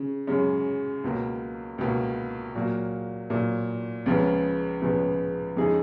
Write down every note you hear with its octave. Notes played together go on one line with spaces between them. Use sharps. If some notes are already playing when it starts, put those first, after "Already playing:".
Already playing: C#3
F#2 C#3 G#3
C#2 B2 A#3
C#2 B2 A#3
A#2 F#3 A#3
A#2 F#3 A#3
C#2 C#3 F3 G#3 B3
C#2 C#3 F3 G#3 B3
F2 C#3 G#3 D#4 G#4